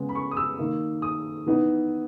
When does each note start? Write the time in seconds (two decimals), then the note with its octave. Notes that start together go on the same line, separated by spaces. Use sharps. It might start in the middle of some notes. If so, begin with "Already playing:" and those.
Already playing: C#3 G#3 B3
0.09 B5
0.15 C#6
0.31 D#6
0.37 E6
0.59 D#3 A#3 D#4
1.02 D#6
1.46 E3 B3 D#4